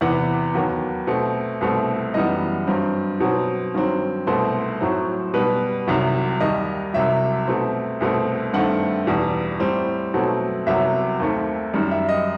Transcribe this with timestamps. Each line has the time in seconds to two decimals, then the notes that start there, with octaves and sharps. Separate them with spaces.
0.01 E2 C3 E3 B3 F#5
0.55 D#2 D#3 F#3 B3
1.07 B2 A3 C4
1.61 C2 B2 A3 C4
2.14 F#2 E3 G3 B3 D#5
2.67 G2 F#3 C4
3.20 B2 F#3 C4
3.74 G2 D#3 F#3 C4
4.27 C2 B2 A3 C4 C5
4.80 A2 F#3 C4
5.34 B2 G3 B3 B4
5.87 C2 C3 D#3 F#3
6.40 D#2 D#3 G3 D#5
6.94 C2 C3 F#3 E5
7.47 B2 A3 C4
8.00 C2 B2 A3 C4
8.53 G2 D#3 A3 C4 F#5
9.07 E2 B2 G3
9.60 A2 G3 C4
10.14 B2 F#3 A3 C4
10.66 C2 C3 F#3 B3 E5
11.20 D#2 D#3 A3 C4
11.73 F#2 D#3 G3
11.91 E5
12.09 D#5